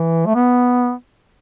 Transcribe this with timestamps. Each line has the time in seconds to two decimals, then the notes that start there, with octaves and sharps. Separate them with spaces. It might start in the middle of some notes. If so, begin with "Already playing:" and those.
Already playing: E3
0.26 A3
0.35 B3